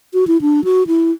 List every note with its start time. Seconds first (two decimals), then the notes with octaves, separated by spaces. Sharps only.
0.14 F#4
0.27 E4
0.41 D4
0.64 F#4
0.87 E4